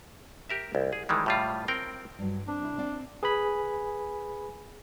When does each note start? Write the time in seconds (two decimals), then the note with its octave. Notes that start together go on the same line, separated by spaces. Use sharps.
0.50 G4 A#4 E5
0.75 C2
0.93 G#4
1.09 D#3 E3 G3 G#3
1.26 A2 G3 F4
1.68 C4 A#4 G5
2.19 G2 F#3
2.48 C4 D4
2.62 C3 E4
2.78 C4 D5
3.23 G#4 B4 G#5 B5